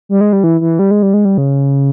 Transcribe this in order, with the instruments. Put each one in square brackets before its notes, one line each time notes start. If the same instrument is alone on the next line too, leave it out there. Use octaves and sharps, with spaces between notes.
[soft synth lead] G3
G#3
G3
E3
E3
G3
G#3
G3
G#3
G3
C#3